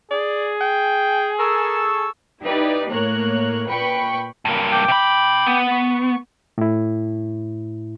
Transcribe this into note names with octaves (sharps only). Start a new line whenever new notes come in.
G#4 D5
G5
A4 A#4 C#6 E6
D#4 E4 G4 B4 D5
A2 A#3 A#4 C#5 F#6
A#2 B4 G5 B5 C#6 C#7
G2 A#3
G5 D6
C3 B5
B3
C#6
A2 E4